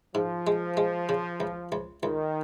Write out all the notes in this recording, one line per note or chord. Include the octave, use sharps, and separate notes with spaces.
G#2 F3
G#3
G#3
C#3
C#2
C#2
C#2 D#3